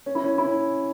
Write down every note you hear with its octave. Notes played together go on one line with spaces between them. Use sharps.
C#4
E4
C#4
E4
C#4